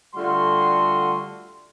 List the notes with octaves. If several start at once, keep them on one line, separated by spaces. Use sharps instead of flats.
D3 G3 A3 F4 F#4 C6